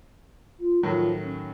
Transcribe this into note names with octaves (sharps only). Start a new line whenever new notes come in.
F4
A2 D#3 F3 F#3
C#4